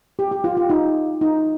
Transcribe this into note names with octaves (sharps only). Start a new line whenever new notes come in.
G4
G4
F4
F4
D#4
D#4